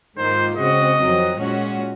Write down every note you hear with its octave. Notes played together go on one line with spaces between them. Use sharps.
G#2 D#3 A#3 F4 C5
C#3 G#3 C4 F#4 D#5
F2 D#3 F#3 C4
A#2 G#3 C#4 F#4